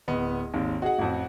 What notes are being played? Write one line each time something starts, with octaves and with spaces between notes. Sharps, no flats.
D1 B3 D#5
G#1 D#2
D#4 F#4 G#4 F#5
A1 F2